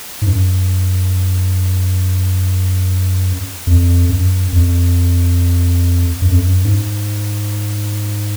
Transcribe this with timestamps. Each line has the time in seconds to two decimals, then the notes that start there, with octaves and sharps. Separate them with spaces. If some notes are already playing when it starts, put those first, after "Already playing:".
0.22 G#2
0.26 F#2
3.67 F2
4.09 F#2
4.52 F2
6.22 F#2
6.30 F2
6.38 F#2
6.65 G#2